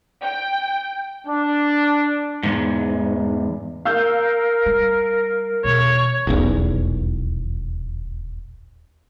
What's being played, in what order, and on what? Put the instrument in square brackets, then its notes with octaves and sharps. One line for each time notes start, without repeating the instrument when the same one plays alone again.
[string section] G5
[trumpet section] D4
[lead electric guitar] E2 G#2
[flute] A#4 [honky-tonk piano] F5 E6 G6
[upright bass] G3
[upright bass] E2 B2 [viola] C#5
[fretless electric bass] D#1 B1 E2